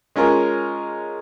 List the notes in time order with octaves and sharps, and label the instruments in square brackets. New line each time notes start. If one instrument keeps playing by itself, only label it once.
[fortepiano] G#3 C#4 F4 A#4